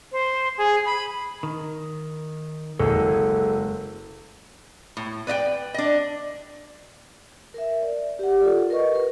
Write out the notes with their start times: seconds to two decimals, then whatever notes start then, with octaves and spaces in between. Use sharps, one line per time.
0.12 C5
0.58 G#4
0.86 B5
1.43 D#3
2.80 F#1 G#3 A4
4.97 A2
5.27 B4 D5 D#5 G5
5.74 D4 D#5
7.54 A#4 E5
7.83 D5
8.19 G4 F#5
8.41 F4 A4 A#4 D5
8.70 A#4 B4 D#5 C#6
8.95 A#4